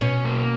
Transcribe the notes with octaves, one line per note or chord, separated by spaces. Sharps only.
B2 C#4
A#3